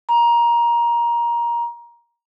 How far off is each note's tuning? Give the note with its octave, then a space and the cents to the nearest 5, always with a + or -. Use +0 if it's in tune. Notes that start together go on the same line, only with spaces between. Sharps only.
A#5 +20